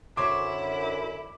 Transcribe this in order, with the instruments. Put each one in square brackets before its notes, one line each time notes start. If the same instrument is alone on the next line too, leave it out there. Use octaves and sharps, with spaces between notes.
[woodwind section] F#2 D3 [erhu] E4 [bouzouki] C5 C#5 [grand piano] D6